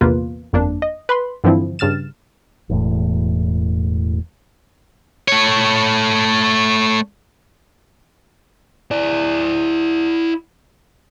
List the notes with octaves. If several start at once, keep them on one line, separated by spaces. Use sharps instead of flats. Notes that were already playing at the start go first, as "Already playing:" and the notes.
A#1 E2 C3 A#3 F4 B4
G1 F2 A#3 D4
D#5
B4 B5 C6
G2 D3 E3 F3 C4 E4
G2 C#3 F6 A6 E7
E1 E2 A2
A3 C#5
E4 D5